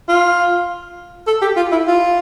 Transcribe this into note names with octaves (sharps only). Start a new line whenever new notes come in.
F4
A4
G4
F4
E4
F4